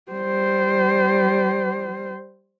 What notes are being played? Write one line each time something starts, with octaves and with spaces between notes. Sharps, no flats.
G3 C5